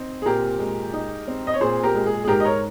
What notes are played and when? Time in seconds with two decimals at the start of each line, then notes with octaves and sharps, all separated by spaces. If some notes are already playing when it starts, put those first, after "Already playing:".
Already playing: C4 D#4
0.22 G#4
0.26 A#2 G4 A#4
0.59 G#3
0.93 D#4
1.28 C4
1.47 D#5
1.54 C#5
1.61 A#2 G#4 C5
1.84 G4 A#4
1.95 G#3
2.06 G#4
2.24 G#4
2.28 G#2 G4 A#4
2.40 D#5
2.45 A#4 C#5